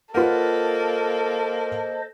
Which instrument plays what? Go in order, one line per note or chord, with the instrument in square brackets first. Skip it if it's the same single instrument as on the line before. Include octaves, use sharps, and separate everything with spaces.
[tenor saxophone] A#3 [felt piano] F4 B4 F#5 [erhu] A4 [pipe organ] C5 D#5